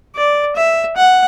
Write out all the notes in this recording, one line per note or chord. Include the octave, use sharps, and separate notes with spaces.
D5
E5
F#5